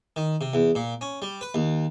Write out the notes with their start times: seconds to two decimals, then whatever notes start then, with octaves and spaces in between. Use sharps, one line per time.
0.16 D#3
0.41 C3
0.53 E2
0.75 A#2
1.01 C#4
1.22 G3
1.41 B4
1.54 D#2